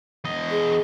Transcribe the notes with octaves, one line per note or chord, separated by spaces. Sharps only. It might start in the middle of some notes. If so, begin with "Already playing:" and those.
E2 D#5
G#4